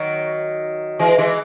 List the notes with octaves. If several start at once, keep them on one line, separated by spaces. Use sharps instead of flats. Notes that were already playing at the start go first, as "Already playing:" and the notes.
Already playing: D#3 F#3
E3 G#3
E3 G#3